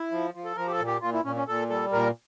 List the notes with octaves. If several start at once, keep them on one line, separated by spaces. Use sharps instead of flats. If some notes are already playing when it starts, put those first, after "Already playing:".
Already playing: E4
F3
F3
A4
F3 A#4
G4
A4
A#2
G4
A#2 F4
E4
A#2 C#4
C#4
A#2 A4
G3 A4
A#2 A#4